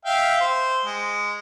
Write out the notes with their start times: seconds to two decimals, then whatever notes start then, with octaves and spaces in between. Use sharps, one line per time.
0.05 E5 F5 G5
0.41 C5
0.85 G#3